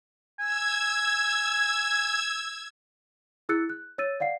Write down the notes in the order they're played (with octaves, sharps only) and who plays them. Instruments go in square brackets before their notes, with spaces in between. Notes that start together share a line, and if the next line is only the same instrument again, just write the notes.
[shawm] G#5 [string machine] E6 G#6
[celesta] E4 G#4 E6 F#6 A6 C#7
F#6
C#5 E6 A6 D#7
D5 F5 F#5 C7